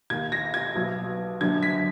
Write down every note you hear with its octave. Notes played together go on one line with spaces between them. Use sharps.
D#2 D#3 G#6
A#6
G#6
B1 B2
F#1 F#2 D3 G#6
B6